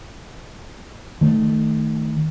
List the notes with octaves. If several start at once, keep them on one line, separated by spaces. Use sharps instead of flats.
D#3 A3